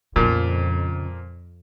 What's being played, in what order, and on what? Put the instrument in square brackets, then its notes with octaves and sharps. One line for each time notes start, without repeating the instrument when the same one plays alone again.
[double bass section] F2 [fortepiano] A#2 F3 [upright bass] C#3